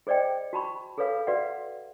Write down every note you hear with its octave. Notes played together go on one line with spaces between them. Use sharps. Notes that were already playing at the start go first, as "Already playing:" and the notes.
G#4 C5 D5 D#5 G5
F#4 A5 B5 C#6
G#4 A4 B4 C#5 F5
F#4 B4 D5 E5 F#5